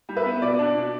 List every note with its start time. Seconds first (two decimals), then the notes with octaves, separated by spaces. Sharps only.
0.09 G3
0.17 B4 E5
0.25 B3
0.42 B2 D5
0.59 D4
0.76 B2